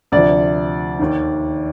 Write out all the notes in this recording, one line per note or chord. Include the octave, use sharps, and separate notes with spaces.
D2 C3 F3 D5
D#2 D#3